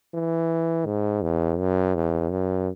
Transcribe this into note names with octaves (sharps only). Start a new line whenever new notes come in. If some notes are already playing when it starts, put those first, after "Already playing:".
E3
G#2
E2
F#2
E2
F#2